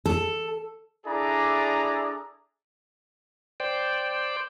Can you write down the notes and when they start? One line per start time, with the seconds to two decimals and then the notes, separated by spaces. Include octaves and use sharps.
0.06 A4
1.06 D4 E4 G#4 A4 D5 A#5
3.60 C5 D5 G5